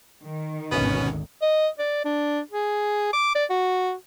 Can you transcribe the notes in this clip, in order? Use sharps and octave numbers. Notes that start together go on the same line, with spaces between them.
D#3
G#1 D2 B2 B3 C#4
D#5
D5
D4
G#4
D6
D5
F#4